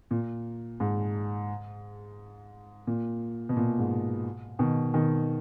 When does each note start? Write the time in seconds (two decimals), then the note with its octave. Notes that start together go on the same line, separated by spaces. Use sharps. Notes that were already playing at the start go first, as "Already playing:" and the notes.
0.11 A#2
0.80 G#2
2.87 A#2
3.49 B2
3.57 A#2
3.79 G#2
4.59 B2 D#3
4.94 B2 D#3